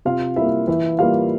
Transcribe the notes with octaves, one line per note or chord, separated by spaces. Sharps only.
C3 F4 F5
G3 E4 E5
A#3
E3 E4 E5
G3 A#3 F4 F5